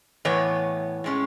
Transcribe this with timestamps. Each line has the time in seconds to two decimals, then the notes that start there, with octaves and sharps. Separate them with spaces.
0.25 A2 E3 B3 C#5
1.04 A2 G#3 C#4